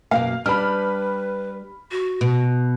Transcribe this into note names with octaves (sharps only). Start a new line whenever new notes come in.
F#2 B2 A#3 F5
G3 D4 B4 B5 F6
F#4
B2